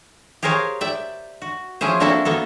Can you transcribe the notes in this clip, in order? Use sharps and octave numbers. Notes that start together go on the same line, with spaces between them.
G4 G#4 A#4 C5 C#5 F5
D5 E5 G5
F#4
F3 C#4 E4 G#4 C5
A#3 C4 D4 E4 F#4 A4
A#3 B3 A4